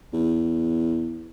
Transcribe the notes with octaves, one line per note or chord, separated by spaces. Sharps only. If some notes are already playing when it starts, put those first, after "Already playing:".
E2